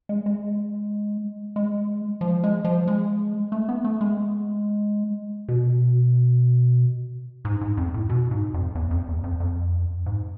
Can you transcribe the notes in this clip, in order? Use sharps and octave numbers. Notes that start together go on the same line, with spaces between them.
G#3
G#3
G#3
F3
G#3
F3
G#3
A3
B3
A3
G#3
B2
G#2
G#2
F2
A2
B2
G#2
F2
E2
F2
E2
F2
F2
G#2